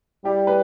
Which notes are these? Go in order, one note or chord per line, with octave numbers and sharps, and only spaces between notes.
G3 E4 G4
B4